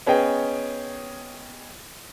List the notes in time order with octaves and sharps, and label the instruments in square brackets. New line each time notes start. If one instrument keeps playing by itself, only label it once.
[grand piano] B3 C#4 G#4 D#5 G5